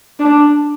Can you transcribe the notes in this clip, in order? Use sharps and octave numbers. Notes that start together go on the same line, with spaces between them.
D4